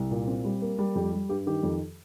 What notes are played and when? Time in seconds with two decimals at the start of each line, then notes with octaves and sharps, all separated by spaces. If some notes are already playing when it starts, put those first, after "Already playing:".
Already playing: C2
0.11 A#2
0.27 C4
0.45 G3
0.62 A#3
0.79 G3
0.95 F2 G4
1.12 G3
1.29 G2 G4
1.46 D#3 G4
1.63 F2